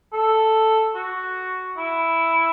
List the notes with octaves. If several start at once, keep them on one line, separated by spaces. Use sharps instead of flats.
A4
F#4
E4